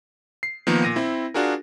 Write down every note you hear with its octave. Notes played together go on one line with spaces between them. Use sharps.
C7
D#3 F3 A#3 B3 D#4
A#2 A#6 D#7
C4 E4
D4 F4 F#4 G#4 A#4